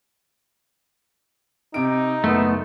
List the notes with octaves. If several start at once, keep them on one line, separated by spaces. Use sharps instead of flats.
C3 D#4 D7
F#1 A3 B3